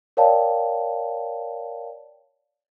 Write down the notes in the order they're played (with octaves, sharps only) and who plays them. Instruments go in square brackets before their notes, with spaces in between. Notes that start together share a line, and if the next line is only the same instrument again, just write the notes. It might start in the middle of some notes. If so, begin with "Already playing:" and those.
[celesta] A#4 C#5 D5 F5 G5 A5